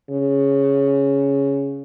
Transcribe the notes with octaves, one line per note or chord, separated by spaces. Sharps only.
C#3